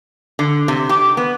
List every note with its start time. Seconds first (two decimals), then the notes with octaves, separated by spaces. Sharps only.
0.39 D3
0.68 C3
0.89 G4
1.17 B3